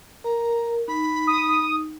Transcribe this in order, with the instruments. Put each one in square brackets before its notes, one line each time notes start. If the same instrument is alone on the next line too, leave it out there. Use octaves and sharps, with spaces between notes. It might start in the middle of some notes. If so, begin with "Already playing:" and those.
[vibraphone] A#4 [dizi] A#5
[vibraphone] D#4 [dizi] B5
[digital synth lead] D#6